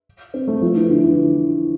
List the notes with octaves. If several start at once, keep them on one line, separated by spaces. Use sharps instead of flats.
C4
A3
F3
E3
D3
E3